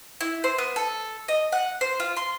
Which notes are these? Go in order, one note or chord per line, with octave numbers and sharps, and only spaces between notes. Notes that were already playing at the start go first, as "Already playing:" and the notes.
E4
C5
B3
A4
D#5
F#5
C5
F4
C6